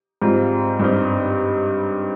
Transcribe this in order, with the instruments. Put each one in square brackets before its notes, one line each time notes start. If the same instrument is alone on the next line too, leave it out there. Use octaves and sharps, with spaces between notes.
[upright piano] G#2 G3 C4 F4
G2 G3 C4 D#4